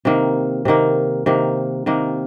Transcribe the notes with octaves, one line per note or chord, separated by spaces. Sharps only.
C3 D#3 A#3
C3 D#3 A#3
C3 D#3 A#3
C3 D#3 A#3